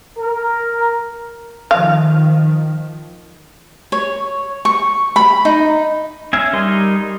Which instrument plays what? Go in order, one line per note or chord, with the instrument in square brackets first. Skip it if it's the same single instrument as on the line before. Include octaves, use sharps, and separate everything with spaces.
[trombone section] A#4
[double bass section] D#3 F3 [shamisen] F5
[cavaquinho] C#5
C#6
B5
D#4
[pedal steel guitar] C#4 E5 F5 G#5
G3 D#4 A#4 C6